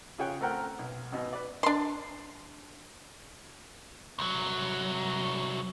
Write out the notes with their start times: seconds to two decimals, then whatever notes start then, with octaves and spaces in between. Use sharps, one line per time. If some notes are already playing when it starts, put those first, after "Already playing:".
0.18 C#3 F4 G#4 C#5 G5 F#6
0.41 A3 C4 A#4 F#5 G5 F6
0.79 B1
1.12 G#1 B2
1.33 B4 D5
1.63 D4 C6
4.19 C2 F#3